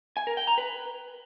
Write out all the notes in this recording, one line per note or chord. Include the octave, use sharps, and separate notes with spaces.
G#5
A#4
G5
A#5
B4